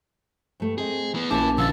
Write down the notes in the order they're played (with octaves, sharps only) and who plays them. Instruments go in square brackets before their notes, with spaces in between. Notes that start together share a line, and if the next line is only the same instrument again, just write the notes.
[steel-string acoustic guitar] G2 A3
[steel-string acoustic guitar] C4 D#5 [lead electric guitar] G#4
[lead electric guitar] E3 B3
[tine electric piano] A#1 A#3 D6 [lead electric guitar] E3 E4 [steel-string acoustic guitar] C#4 [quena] A5
[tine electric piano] A#1 F5 A6 [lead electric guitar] D3 F3 [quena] E6